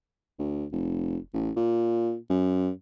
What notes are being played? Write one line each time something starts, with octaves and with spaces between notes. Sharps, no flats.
D2
F1
A1
A#2
F#2